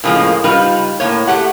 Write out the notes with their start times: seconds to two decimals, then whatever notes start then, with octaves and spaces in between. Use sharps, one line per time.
0.04 A2 C#3 F3 G#3 A#3
0.44 C#3 G3 D#4 F4 B4
1.00 A2 A#3 C#5
1.28 A3 G4 F#5